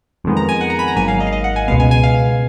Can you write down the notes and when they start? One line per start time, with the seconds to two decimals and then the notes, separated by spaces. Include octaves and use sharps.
0.24 F2 D#3 G#3 B3
0.37 A#5
0.49 G#5
0.61 F#5
0.70 A#5
0.79 B5
0.88 A#5
0.96 G#1 G#2 F#3 A#3 G#5
1.08 F5
1.20 D#5
1.27 F5
1.32 D#5
1.44 F#5
1.56 G#5
1.68 C#2 B2 G#3 B3 F5
1.80 G#5
1.91 G#5
2.03 F5